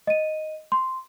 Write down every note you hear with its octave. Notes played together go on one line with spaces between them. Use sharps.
D#5 D#7
C6